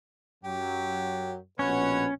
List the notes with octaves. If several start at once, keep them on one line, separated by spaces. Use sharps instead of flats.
F#2 F#3 G4
A#1 B2 C#4 B4 C#5 F#5